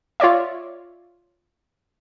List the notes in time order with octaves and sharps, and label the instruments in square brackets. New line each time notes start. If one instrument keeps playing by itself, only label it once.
[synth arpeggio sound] F4 C#5 D5 E5